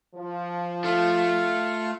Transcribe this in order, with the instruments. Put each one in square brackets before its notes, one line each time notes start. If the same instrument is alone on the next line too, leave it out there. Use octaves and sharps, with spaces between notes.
[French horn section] F3
[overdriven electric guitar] A3 [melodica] F4 F5